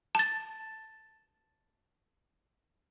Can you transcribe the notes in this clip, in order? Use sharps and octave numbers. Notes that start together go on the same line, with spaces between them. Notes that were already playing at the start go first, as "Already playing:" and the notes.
A5 A6